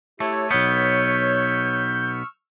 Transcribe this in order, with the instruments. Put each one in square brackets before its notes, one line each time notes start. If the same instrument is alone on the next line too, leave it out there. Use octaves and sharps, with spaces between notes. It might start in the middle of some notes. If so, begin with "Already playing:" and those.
[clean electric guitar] A3 [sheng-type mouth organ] E4 [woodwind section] G4 C#5
[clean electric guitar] B1 B3 [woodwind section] C#5 [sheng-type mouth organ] C#6 E6 F6 [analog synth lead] G6